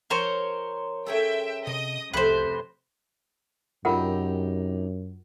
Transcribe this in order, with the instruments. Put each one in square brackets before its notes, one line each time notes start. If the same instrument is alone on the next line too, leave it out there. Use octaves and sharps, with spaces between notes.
[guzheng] F3 [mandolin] A#4 C5 C#5
[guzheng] C#4 G#4 A4 [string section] E5 G5
[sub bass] C3 [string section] D#5 D#6 [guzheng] A5
[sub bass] C2 [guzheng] F2 A3 C6 [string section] C3 [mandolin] B4 C5
[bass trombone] F#2 [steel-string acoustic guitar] C3 D#4 G4 [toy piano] F4 A#4 F#5